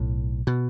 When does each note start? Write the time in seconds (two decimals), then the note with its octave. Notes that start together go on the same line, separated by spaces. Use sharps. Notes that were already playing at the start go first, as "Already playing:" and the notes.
Already playing: B1 A2
0.47 B2